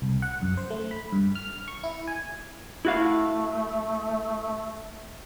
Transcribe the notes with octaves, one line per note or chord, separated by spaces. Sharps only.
C2
F#5
F#2
C5
A3
B5
G2
F6
C#6
E4
G#5
A3 E4 F#4 F5